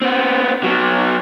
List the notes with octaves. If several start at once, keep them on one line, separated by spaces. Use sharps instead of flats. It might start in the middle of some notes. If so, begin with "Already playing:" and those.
B3 C4
F#3 B3